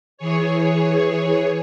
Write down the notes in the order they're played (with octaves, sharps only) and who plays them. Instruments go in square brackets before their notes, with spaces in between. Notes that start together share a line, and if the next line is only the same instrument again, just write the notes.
[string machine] E3 G#4 C#5